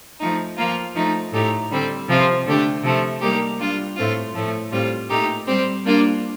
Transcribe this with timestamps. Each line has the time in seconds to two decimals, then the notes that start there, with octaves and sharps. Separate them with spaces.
0.20 F3 A3 D#4
0.58 F3 A#3 F4
0.95 F3 A3 D#4
1.33 A2 A3 D#4 G4
1.71 D3 G3 C4
2.08 C3 F3 C4 F4
2.46 D3 A3 D4 G4
2.83 C3 F3 A3
3.21 G3 A#3 D#4 G4
3.59 G3 D4 F4
3.96 A2 A3 C4 F4
4.35 A2 F3 A3
4.72 A2 G3 C4 F4
5.10 A#2 A3 D#4 G4
5.47 G3 C4 G4
5.85 G3 A#3 D4 F4